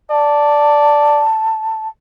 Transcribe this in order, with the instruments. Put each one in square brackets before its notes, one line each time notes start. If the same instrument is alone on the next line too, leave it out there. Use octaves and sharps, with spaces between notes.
[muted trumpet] D5 [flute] A5